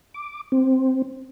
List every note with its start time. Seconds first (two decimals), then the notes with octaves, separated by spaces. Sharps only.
0.14 D6
0.52 C4